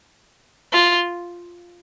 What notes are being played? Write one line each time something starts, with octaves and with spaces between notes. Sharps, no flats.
F4